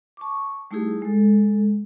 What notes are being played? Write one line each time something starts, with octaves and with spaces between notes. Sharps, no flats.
A5 C#6 D6
G3 A3 D#4 E4 G4 G#4
G#3 A4